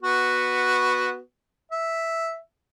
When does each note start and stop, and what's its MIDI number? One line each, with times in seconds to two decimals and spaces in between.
0.03 1.18 59
0.03 1.18 66
1.71 2.38 76